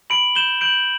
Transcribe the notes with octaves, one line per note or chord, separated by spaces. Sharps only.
B5 D7 F#7
G6 E7 G7
G6 D7 F#7